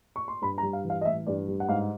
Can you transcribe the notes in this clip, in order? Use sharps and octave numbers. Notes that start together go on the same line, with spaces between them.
C#6
C6
G2 B5
A#5
G3
F5
E3
F5
D#5
A1 E5
G2 D5
G3
F#5
G#2 F5